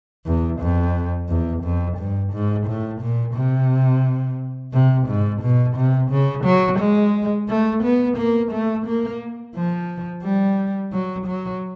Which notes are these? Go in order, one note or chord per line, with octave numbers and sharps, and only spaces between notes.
E2
F2
E2
F2
G2
G#2
A2
A#2
C3
C3
G#2
B2
C3
C#3
F#3
G#3
A3
B3
A#3
A3
A#3
F3
G3
F#3
F#3